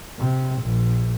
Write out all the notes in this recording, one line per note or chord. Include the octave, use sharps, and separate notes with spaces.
C3
A#1